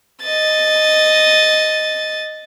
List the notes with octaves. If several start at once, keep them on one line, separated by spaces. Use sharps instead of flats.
D#5 A6